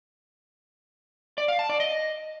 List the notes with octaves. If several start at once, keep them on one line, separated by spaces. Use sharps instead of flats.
D5
F5
A5
D5
D#5